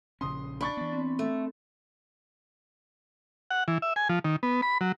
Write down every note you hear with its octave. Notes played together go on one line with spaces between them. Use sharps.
A#1 C#3 C#4 C6 D#6
D4 B5 C#6 A6
E3 B3
C4
A3
F#5
E3
E5
G#5
F3
D#3
B3
B5
F#3